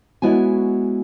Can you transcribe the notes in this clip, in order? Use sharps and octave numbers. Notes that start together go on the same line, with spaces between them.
G#3 B3 E4 F#4 C#5 G#5